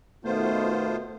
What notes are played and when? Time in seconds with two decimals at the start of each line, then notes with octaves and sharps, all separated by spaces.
0.24 B2 D#3 A3 B3 F4 C5